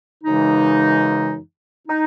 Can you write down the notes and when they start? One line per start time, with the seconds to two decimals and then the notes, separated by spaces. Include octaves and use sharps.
0.24 F#2 C#3 E3 G#3 D#4
1.88 D#4